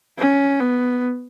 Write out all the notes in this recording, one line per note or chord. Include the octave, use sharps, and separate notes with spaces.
C#4
B3